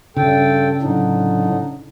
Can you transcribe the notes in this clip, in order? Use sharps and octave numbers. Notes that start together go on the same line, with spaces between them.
G2 C#3 A4 G5
A2 D3 F#3 D4 D#4